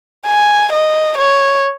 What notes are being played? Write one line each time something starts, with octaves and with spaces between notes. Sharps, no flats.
G#5
D#5
C#5